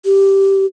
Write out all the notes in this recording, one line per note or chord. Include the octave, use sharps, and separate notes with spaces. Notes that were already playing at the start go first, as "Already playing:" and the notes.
G4